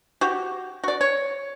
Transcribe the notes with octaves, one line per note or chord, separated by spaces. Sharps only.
F#4 G4
F#4 D5
C#5